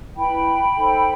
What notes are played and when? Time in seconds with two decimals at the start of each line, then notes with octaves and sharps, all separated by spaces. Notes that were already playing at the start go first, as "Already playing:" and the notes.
0.16 E4 B4 G5 B5
0.77 D#4 A4 C5